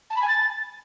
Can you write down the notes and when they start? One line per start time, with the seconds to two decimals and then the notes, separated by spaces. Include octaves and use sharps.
0.10 A5
0.16 B5
0.22 G#5
0.28 A6